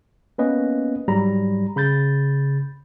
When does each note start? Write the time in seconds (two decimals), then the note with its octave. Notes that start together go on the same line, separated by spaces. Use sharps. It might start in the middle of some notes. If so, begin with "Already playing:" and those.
0.38 A#3 B3 C#4 B4 D#5
1.08 G#2 F#3 G3 G4 A#5 B5
1.76 C#3 B5 G6 A6